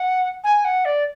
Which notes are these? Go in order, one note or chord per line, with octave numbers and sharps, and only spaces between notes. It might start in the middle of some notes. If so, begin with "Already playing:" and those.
Already playing: F#5
G#5
F#5
D5